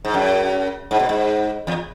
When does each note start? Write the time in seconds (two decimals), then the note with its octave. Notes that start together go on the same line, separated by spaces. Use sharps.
0.05 G#2
0.14 F#2
0.91 G#2
0.99 B2
1.09 G#2
1.67 E2